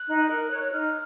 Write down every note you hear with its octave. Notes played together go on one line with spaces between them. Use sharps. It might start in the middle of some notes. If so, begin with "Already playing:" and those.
Already playing: F#6
D#4
A#4
C#5
D#4 F6